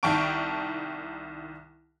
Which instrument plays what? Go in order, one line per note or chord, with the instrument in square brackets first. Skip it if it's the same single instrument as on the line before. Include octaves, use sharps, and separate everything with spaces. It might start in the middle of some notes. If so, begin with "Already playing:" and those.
[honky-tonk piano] C2 D#3 G5 A5 C#6 D7